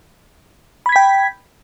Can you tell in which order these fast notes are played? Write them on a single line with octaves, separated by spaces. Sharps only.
B5 G#6 B6 G5